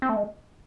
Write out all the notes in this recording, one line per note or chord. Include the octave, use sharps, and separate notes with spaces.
C4
A3
G#3